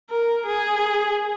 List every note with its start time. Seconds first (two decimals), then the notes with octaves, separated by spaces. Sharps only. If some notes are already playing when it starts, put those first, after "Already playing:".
0.10 A#4
0.46 G#4